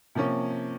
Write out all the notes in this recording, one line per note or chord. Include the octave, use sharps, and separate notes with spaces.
C3 F3 A#3 C#4